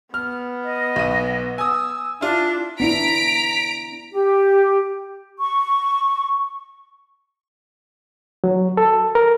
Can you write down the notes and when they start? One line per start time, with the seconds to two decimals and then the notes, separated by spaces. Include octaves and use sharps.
0.14 B3 F6
0.64 D#5
0.96 B1 D#7
1.58 G#5 D#6 E6
2.21 D4 E4 F4
2.80 B3 D4 E4 A#5 B6 D7
4.12 G4
5.39 C#6
8.44 F#3
8.77 A4
9.15 A#4